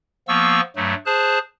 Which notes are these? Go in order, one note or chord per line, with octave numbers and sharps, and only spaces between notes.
F3 A#3 B3 C#6 E6
G2 F#3 A3
G#4 C5 A5 F#6